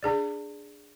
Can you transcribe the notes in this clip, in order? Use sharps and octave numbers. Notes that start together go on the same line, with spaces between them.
D4 G#4 D5